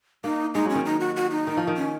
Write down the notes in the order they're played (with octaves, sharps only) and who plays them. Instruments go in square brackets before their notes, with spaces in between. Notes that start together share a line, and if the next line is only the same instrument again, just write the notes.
[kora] A#3 [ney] D#4
[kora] G#3 [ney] D#4
[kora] F#3 [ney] C#4
[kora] D#3
[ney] D#4
F#4
F#4
D#4
[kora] D#3
F3
D#3
[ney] C#4